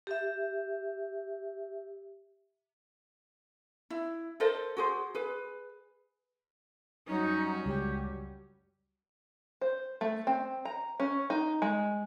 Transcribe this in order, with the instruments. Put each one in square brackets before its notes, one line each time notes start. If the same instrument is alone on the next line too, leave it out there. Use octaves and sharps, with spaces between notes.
[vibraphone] G4 E5
[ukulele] E4
A4 A#4 C5 D#5
F#4 G#4 C5
G#4 B4
[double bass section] F#2 F#3 G3 [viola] C#4 F#4 [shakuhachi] D#4
[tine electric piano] C#2 [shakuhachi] G4
[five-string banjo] C5
A3
C4
A#5
C#4
D#4
G#3